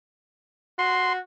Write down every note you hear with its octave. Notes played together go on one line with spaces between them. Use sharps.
F#4 C6